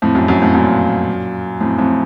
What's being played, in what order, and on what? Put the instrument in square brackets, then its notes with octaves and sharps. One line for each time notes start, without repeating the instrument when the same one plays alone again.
[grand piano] F2 A2
F#2
F#2
F2 A2
F#2 A#2
F2 A2
F2 A2